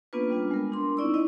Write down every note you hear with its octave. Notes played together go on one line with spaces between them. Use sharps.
A#3 B3 C#4 D4 F4 B4
G3 B3 D4 F4
G#3 A#4
D4 C6
C4 D#4 E4 D5 C#6 E6
C#4 E4 D#5